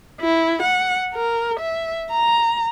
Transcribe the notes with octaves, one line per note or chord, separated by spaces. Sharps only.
E4
F#5
A#4
E5
A#5